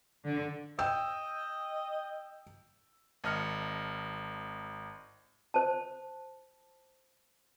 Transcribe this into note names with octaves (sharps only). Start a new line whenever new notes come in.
D3
D#5 G5 E6
G#1 D#5 F6 C#7
C5 A5